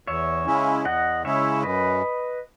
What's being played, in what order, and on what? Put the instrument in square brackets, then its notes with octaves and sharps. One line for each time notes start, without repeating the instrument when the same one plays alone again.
[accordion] E2 [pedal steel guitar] C#5 E5
[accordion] C#3 G#3 C#4 E4
[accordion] E2 [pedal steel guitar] D#5 F#5
[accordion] C#3 G#3 C#4 E4 [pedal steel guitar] C#5 E5
[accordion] F#2 [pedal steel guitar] B4 D#5